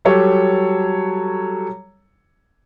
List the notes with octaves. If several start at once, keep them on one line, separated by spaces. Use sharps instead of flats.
F#3 G3 G4 A4 C#5